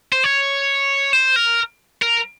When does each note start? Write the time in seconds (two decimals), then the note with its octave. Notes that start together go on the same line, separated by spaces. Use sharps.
0.12 C5
0.24 C#5
1.13 C5
1.36 A#4
2.02 A#4